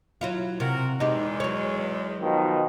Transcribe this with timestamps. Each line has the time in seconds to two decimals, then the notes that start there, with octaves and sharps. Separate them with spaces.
0.21 F#3 E4 F4
0.60 C3 F#4 A#4
1.00 E2 G#3 D#4 G4
1.40 F#3 C#5
2.21 B2 D#3 F3